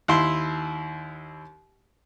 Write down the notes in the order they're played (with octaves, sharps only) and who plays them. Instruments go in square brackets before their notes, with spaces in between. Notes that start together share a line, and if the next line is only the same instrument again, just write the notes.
[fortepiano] D#2 E4 C6